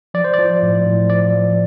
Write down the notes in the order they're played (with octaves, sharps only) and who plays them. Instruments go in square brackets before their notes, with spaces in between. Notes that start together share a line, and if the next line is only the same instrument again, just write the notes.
[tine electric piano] F3 D5
C5
D5
F3
A2
A2
F3 D5
F3